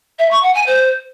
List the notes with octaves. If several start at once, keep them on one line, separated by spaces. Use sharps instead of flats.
E5
C#6
F#5
G#5
C5